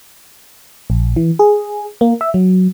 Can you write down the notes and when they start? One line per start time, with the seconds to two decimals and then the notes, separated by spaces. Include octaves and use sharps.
0.90 A#1
1.16 E3
1.39 G#4
2.01 A#3
2.21 E5
2.34 F#3